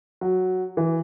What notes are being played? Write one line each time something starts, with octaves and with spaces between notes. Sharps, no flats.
F#3
E3